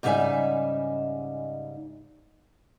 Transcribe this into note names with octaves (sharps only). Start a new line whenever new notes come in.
G#2 C#3 G3 D#4 E5 G#5